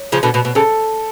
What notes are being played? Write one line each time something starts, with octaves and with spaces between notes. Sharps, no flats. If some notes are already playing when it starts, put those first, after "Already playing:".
Already playing: C#5
C#3 F3
B2 D3
B2
B2
C#3 A4